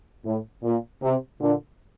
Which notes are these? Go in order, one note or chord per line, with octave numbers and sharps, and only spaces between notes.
A2
A#2
C3
A#2 D3